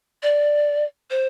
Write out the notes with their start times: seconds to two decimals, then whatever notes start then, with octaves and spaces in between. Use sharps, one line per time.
0.22 D5
1.10 C5